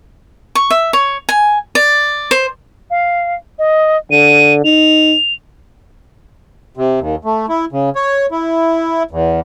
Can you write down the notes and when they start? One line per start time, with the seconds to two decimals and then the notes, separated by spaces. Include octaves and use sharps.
0.55 C#6
0.71 E5
0.93 C#5
1.29 G#5
1.75 D5
2.31 C5
2.90 F5
3.59 D#5
4.11 D3 D#7
4.65 D#4 F7
6.77 C3
6.99 D#2
7.25 A3
7.49 E4
7.72 C#3
7.95 C#5
8.31 E4
9.11 E2